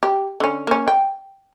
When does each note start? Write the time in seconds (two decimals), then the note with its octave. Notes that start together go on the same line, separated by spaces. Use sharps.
0.03 G4
0.40 D3 C#4
0.67 A#3 C#4
0.88 G5